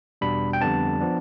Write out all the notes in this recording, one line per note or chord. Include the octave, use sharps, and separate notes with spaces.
E2 B2 G3 B3 D4 B5
G5
F2 D3 G3 B3 D4 A5
F3 B3 D4